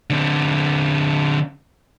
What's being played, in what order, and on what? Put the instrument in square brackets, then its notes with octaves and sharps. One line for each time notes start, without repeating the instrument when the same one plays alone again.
[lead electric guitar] D3 C4